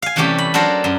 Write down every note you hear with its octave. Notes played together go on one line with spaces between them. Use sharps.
F5 G#5
C3 E3 G3 A3 C#4 G4
B5
F#3 D4 A4 A#4 C5
F#2